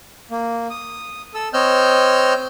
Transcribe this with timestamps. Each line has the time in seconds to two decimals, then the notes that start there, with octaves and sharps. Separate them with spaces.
0.31 A#3
0.70 D#6
1.34 A4 E6
1.54 C4 C#5 D#5 E6 F6 G6